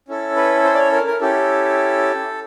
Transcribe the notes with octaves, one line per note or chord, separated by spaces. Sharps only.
C#4 E4 A4
B4
C5
D5
C#5
A#4
A#4
C#4 E4 G4 A4